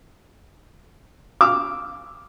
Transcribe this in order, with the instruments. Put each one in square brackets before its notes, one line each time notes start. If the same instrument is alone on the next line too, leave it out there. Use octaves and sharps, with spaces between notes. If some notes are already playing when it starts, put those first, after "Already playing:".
[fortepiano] D6 E6 F6